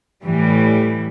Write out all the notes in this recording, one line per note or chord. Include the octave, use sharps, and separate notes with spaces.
A2 E3 G3